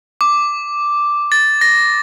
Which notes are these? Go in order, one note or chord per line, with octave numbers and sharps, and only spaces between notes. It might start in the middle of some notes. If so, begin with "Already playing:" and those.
D6
A6
A#6